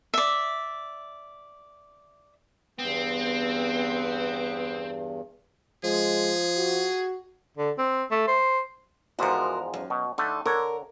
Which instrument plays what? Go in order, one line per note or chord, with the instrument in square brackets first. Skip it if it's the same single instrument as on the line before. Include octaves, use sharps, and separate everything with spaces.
[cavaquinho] D5 E5
[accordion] E2 G2 [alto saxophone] B3 [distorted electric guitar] C4
[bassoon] F3 [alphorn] G#3 [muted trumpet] G#4
[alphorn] F#4
[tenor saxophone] D3
C4
A3
C5
[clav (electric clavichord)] E2 G#2 F3 [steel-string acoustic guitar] F#4 A#4
[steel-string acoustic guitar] F#2
[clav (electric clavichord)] B2
[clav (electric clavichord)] D3 A3 [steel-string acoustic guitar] D#4
[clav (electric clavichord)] D3 C#5 [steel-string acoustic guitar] A#4